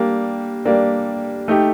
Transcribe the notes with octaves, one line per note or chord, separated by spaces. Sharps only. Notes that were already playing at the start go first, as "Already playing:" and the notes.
Already playing: G3 A#3 D4
G3 A#3 D4
A3 D#4 G4